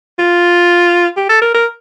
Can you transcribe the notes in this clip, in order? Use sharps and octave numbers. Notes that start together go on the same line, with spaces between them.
F4
G4
A4
A#4
A#4